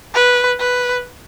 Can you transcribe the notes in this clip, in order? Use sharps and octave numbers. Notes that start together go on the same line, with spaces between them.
B4
B4